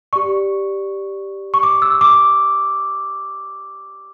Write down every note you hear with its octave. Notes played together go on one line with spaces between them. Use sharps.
G4 D5 C#6
C#6
D6
E6
D6